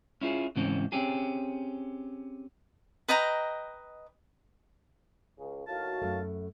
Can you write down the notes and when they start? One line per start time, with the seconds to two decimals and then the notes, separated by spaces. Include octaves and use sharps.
0.21 C#4 E4 F4 G#4
0.56 C#2 G#2 E3 C4 C#4
0.92 C4 C#4 G4 G#4
3.08 B4 D#5 G5 A#5
5.38 C#2 C#3
5.67 D#2 A2 F#4 F5 A5 F6
6.02 F#2 A3